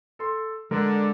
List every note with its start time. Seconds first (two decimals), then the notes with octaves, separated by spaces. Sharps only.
0.19 A4 C6
0.71 D3 G#3 A#4